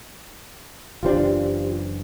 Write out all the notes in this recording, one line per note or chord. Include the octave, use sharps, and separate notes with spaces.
F#1 E3 D4 F4 G4 C5